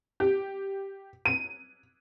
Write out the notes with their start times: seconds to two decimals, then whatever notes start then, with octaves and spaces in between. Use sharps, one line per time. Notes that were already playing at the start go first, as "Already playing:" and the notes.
0.20 G4
1.25 D#7